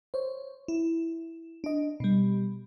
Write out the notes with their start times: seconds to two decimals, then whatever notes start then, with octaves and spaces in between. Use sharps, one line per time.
0.14 C5 C#5
0.68 E4
1.64 D4 D#5
2.00 B2 G3